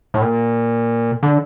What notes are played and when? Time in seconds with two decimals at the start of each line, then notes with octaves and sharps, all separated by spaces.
0.14 A2
0.22 A#2
1.23 D3